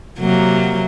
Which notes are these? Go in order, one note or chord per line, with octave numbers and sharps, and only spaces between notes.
C3 F#3 A#3